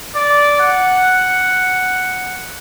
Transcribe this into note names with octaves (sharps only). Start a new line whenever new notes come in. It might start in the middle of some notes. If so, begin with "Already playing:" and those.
D5
F#5